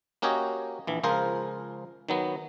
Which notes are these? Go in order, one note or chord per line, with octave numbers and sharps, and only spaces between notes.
A#3 C#4 F#4 G4 C#5 D#5
A#1 E3
C#2 F3 F4 G#4 A#4 C5
D#3 F#3 B3